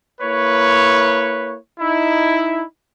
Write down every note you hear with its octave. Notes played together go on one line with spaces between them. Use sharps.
A#3 E4 B4 C#5
D#4 E4